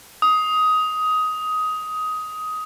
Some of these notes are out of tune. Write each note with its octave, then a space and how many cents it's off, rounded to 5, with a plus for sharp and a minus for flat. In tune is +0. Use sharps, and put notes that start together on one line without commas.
D#6 +15